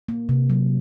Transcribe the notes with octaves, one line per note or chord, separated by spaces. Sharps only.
A#3
C3
F#3